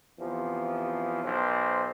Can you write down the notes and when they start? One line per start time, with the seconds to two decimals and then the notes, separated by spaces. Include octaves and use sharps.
0.18 E2 C3 F3
1.23 B1 C5